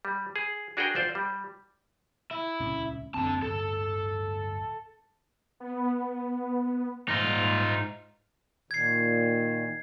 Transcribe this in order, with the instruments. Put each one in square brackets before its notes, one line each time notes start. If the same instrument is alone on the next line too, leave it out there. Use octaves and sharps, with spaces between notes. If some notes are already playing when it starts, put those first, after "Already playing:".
[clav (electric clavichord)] G3
G#4
D4 F#4 G#4 A#4 F#5 G5
F4 C5 D5
G3
[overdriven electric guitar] E4
[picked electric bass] D#1 C#2 C#4
[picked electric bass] F#1 D2 C4 [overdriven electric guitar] D3 A5
[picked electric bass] D1 G1 [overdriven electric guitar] A4
[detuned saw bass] B3
[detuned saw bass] G#2 [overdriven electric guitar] D#4 F4
[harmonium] A#2 D#3 [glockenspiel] G#6 C7